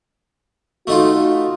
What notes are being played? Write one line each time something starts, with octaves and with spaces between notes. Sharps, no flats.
A3 D#4 F4 F#4